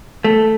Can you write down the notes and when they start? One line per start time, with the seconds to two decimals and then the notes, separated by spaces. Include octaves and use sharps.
0.24 A3